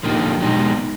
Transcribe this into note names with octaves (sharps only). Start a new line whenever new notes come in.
D3 F3 A#3 D#4 G4
B2 G#3 B3 D#4 G4